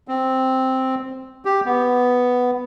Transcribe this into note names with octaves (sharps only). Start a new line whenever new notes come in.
C4
G4
B3